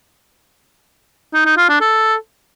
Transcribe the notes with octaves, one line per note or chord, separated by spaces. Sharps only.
D#4
D#4
F4
D4
A4